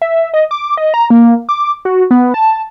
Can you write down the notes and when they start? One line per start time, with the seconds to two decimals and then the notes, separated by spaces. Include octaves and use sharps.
0.02 E5
0.34 D#5
0.51 D6
0.77 D#5
0.94 A#5
1.10 A#3
1.49 D6
1.85 F#4
2.11 B3
2.34 A5